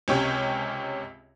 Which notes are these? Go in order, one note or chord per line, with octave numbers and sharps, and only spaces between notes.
C#2 C3 C#4 G4 C#5